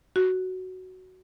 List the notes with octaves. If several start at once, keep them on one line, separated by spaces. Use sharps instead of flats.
F#4